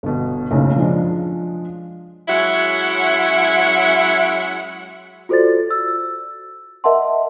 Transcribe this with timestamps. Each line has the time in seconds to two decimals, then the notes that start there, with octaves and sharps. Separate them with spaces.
0.03 G1 B2
0.51 F#1 B1 A2 C#3
0.76 F3 G#3 D4
2.28 F#3 G#3 C#4 E4 E5 F#5
5.29 F4 F#4 A4 C5 D5 A6
5.71 E6
6.84 A#4 D#5 E5 F#5 A5 C6